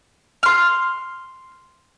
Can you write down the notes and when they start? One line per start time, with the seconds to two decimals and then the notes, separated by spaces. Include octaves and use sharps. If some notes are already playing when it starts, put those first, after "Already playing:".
0.43 C6 F6